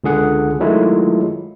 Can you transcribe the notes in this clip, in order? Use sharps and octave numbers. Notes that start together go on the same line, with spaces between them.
C#2 D3 G#4 F#5
D#3 F#3 G#3 A3 E4 F4